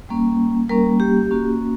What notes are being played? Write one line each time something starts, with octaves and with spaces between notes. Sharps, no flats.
G3 A#3 C#4
G3 A#3 C#4 A#4
G4
A#3 C#4 F#4